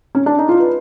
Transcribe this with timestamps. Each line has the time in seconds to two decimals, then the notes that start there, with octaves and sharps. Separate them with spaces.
0.15 C#4
0.26 D4
0.38 D#4
0.49 F4
0.60 B4